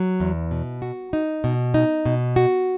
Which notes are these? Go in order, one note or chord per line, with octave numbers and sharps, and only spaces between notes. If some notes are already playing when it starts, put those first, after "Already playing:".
Already playing: F#3
E2
B2
F#4
D#4
B2
D#4
B2
F#4